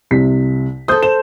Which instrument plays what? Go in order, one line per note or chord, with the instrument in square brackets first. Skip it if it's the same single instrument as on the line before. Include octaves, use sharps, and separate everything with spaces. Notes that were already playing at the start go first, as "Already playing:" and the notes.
[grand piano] C2 C3 B6
[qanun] A4 C5 [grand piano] D#6 G6
[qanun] C5 [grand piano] E7